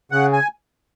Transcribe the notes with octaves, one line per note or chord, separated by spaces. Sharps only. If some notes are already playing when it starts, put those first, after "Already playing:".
C#3 F#5
G#5